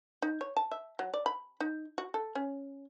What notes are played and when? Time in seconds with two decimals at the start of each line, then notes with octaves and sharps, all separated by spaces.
0.22 D#4
0.41 C#5
0.57 A5
0.71 E5
0.99 F#3
1.14 D5
1.26 B5
1.60 D#4
1.98 F#4
2.14 A4
2.35 C#4